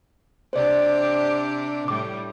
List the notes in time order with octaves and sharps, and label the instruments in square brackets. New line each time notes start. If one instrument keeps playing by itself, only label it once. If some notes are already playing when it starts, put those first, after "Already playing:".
[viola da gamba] C3 D4 G4 [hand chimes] C5 D5
[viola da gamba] A2 G3 [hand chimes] D6